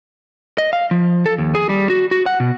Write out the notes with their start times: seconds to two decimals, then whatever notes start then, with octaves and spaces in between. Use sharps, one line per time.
0.58 D#5
0.73 F5
0.91 F3
1.26 A4
1.38 D#2
1.55 G#4
1.69 G3
1.90 F#4
2.11 F#4
2.26 F#5
2.40 B2